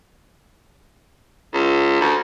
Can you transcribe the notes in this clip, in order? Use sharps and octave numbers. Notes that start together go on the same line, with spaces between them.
C#2
D2